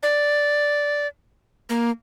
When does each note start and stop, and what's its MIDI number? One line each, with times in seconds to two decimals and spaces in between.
0.03 1.07 74
1.69 1.90 58